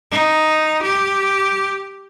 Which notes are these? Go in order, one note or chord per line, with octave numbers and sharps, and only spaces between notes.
D#4
G4